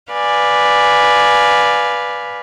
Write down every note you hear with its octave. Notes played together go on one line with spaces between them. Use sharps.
B4 D5 F5 G#5